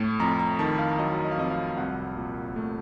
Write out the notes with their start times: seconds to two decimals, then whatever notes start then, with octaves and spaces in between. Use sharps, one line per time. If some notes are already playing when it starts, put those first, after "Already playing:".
Already playing: A2 A3
0.20 F2 A#5
0.39 A#5
0.59 D#3 A5
0.79 F5
0.99 F#3 D#5
1.24 D#5
1.31 F5
1.38 F2 D#5
1.50 F5
1.77 C2 F#5
2.16 A#2
2.56 A3